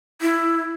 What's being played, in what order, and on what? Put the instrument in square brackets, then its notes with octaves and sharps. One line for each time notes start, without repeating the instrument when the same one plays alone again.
[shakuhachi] E4